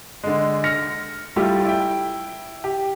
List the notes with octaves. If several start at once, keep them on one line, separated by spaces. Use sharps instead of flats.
D3 G#3
F6 A#6 C#7
G3 A3 E4 F4 G4
E4 G5
G4